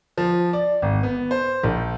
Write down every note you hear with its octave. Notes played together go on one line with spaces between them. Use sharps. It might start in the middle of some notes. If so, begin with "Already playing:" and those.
F3
D5
G#1
B3
C5
A#1